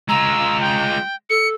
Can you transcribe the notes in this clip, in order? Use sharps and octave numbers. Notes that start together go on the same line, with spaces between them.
G#3 F4 A#5 E6
G5
A4 C#7